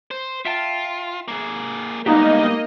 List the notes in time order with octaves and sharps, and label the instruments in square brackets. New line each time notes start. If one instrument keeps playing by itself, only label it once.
[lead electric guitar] C5
[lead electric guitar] F4 [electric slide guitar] E5 G5 A5
[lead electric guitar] A#3 G#4
[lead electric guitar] D2 G2 [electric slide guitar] G#3 B3 G4 [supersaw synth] A#3 D#5 [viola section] D#4